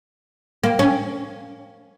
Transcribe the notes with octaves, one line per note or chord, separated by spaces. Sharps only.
A#3
C#4